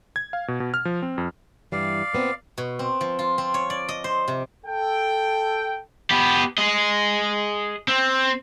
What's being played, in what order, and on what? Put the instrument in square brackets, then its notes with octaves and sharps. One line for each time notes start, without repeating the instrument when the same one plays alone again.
[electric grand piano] G#6
F5
B2
B2
F6
F3
C4
F2
[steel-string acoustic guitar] G2 E3 G3 [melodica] D5 F5
[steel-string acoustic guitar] A#2 B3 C4
[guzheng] B2
C4
F3
F4
C4
C#5
D5
D#5
C5
C3
[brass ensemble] A4 G5
[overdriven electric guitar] B3 G4
G#4 D#5
C4